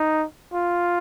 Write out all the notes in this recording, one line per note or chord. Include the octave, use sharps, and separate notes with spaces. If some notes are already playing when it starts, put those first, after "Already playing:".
Already playing: D#4
F4